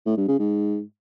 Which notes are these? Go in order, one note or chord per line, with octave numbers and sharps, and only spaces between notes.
A2
G2
C#3
G#2